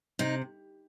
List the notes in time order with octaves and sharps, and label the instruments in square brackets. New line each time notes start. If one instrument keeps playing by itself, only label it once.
[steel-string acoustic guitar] C3 D#4